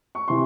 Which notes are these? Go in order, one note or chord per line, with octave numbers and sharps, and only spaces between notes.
C#6
C3 E3 C6